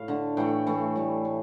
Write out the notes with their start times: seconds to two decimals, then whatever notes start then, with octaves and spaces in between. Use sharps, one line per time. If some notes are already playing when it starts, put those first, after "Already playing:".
Already playing: A2 D5 F5
0.08 D3 A3
0.37 A2 E3 A3 G5
0.67 A2 E3 A3
0.96 A2 G3
1.25 A2